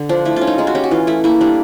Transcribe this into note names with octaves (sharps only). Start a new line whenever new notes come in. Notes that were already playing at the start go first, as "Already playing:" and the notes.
Already playing: D3
F3 D4
A3 E4
C#4 F4
D#4
G#3 D#4
F#4
C#4 G4
F#4
E3 F4
A3 E4
A#3 E4
G3 D4